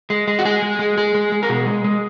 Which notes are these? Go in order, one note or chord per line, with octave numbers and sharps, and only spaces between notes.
G#3
G#3
F#4
G#3 G#4
G#3
G#3
G#3 G#4
G#3
G#3
A#4
B2 G#4
G#3
G#3